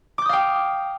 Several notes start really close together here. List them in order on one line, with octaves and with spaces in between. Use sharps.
D6 G6 D#6 F5 G5